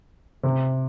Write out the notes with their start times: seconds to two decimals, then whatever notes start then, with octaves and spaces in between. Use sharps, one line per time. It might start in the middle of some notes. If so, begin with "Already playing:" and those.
0.43 C3